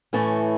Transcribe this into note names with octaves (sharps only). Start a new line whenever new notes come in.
A2 E3 A3 C#4